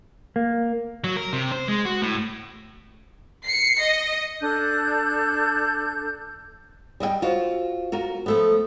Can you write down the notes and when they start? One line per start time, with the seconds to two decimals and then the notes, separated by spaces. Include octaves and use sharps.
0.36 A#3
1.04 F#3
1.16 A#4
1.33 C3
1.52 C5
1.68 G#3
1.85 F#4
2.02 A2
3.46 C7 C#7
3.81 D#5
4.42 D4 A4 F#6 G6
7.00 G3 D#5 E5 G5
7.22 F4 F#4 C5
7.92 F4 F#4 A#4
8.26 F3 A3 B3